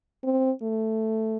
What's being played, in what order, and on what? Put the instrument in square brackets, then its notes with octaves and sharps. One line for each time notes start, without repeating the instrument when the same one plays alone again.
[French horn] C4
A3